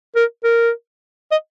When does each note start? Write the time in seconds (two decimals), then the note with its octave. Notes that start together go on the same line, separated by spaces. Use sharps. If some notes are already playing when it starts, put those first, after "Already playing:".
0.16 A#4
0.44 A#4
1.31 D#5